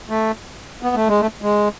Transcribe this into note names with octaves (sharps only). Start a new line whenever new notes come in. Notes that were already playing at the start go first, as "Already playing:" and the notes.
A3
B3
A3
G#3
A3
G#3